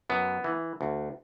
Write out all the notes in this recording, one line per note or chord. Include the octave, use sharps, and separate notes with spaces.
F#2 B3
E3
D2